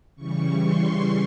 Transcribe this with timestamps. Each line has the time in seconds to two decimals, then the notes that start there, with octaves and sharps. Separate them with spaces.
0.16 C#3 E3 G3 C#6
0.61 C6